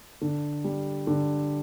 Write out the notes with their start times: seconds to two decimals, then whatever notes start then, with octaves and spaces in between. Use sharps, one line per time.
0.21 D3
0.64 G3
1.07 D3